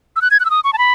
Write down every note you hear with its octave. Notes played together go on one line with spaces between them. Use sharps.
E6
F#6
G#6
F#6
E6
D#6
C#6
A5
B5